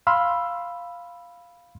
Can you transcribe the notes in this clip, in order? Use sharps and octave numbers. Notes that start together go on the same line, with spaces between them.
F5 B5 C6 E6 F6